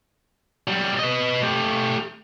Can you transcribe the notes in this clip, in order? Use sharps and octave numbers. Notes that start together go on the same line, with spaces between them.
F#3 G3
B4 D#5
A3 G4